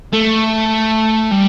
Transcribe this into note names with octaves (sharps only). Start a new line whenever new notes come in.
A3
G3